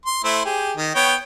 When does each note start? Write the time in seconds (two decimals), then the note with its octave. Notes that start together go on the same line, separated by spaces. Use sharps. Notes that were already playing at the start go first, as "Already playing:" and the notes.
0.05 C6
0.24 A3 E4 C5
0.45 G4 G#4
0.77 D#3
0.95 B3 C#5 G5